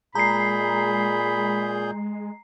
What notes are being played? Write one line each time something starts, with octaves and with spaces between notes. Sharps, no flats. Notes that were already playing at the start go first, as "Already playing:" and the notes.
A#2 G#3 G#4 A#5 B5 G6 C7